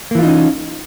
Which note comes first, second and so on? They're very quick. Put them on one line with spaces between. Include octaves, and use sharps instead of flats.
A#3 E3 F4 D#4 C#4